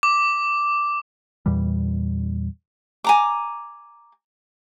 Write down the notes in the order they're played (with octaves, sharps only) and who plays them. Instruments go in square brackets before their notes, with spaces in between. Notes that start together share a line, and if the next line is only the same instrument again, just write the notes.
[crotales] D6
[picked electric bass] E2 A#2 E3 G3
[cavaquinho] G#5 A#5 D6